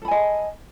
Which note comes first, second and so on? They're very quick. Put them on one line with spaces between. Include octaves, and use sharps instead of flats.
A4 B5 G#5 D#5